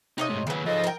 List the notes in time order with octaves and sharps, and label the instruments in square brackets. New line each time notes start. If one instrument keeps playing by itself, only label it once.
[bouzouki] C3 C#5 D#5 [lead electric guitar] D#4
[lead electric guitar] G#2 A3
[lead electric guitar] D#2 B4 [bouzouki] C#3 F#3
[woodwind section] G#2 A4 D#5 [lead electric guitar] F3 C5
[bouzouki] A#4 G5